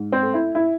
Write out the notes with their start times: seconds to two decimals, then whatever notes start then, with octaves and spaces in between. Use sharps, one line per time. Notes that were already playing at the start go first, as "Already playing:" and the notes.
Already playing: G#2
0.12 C4
0.23 A3
0.34 E4
0.55 E4